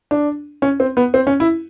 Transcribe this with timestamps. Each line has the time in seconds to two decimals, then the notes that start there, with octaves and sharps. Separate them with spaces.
0.11 D4
0.62 C#4
0.80 C4
0.97 B3
1.14 C4
1.27 C#4
1.40 E4